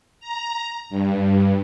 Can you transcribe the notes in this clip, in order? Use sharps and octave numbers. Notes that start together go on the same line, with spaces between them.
A#5
G2